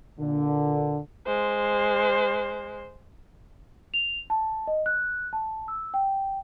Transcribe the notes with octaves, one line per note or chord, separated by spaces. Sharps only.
A#2 D3
G#3 C5
F7
A5
D#5
F#6
A5
E6
G5